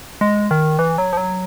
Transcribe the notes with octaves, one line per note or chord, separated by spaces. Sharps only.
G#3
D#3
E3
F#3
F3
F#3